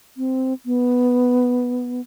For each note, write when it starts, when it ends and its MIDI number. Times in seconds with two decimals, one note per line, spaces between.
0.17 0.53 60
0.66 2.01 59